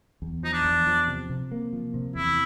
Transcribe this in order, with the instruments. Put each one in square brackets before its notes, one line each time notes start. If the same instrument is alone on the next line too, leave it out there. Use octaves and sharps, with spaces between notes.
[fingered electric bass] E2
[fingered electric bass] F3 [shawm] D#4
[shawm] D4
[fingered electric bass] E2
F3
C3
C3
A#3
F3
C3
[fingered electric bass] E2 [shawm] E4